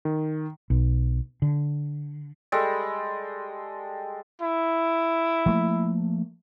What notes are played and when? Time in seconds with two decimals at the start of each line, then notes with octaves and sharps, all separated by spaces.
0.05 D#3
0.70 B1
1.42 D3
2.52 G3 G#3 A4
4.41 E4
5.46 F3 A3 A#3